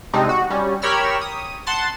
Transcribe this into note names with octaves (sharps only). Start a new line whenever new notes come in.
C3 G#3 C4 D4 D#4
F#4
G3 C#4
G4 A#4 C#5 B5 E6 F6
D#6
F#5 A5 C6 A6